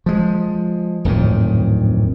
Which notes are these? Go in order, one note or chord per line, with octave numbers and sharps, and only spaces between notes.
F3 G#3
D1 F2 G#2 D#3